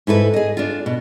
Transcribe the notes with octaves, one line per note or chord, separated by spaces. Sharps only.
G#2 E4 A4 B4
G#4 D#5
D4 F4
B2